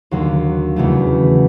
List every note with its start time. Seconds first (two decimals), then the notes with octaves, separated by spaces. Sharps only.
0.11 D#2 D3 F#3 A#3
0.76 E2 C#3 F#3 A3